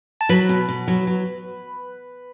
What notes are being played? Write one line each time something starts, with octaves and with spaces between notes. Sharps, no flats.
A5
F#3 B4 B5
B2
B2
F#3
F#3